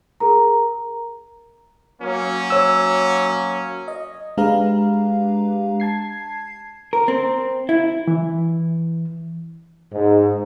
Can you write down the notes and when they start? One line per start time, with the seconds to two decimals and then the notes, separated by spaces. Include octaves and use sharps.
0.20 G#4 A#4 A#5
2.01 F#3 A#3 C#4
2.50 C#5 E6
3.88 D#5
4.38 G#3 D4 G4 B4 F5 A#5
5.80 A5 G#6 C7
6.93 A#4
7.08 C4
7.69 E4
8.08 E3
9.93 G#2